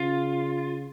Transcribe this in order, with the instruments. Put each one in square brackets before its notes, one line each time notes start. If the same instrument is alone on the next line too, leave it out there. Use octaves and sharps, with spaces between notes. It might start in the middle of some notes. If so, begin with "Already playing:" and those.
Already playing: [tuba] C#3 [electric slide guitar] F4